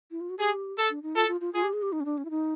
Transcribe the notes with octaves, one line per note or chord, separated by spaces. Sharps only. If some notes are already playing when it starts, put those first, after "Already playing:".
E4
F4
F#4
G4 G#4
A4
D4
D#4
F4 A4
F4
F4
F4 G#4
G4
G#4
G4
D#4
C#4
D4
C#4
E4
D#4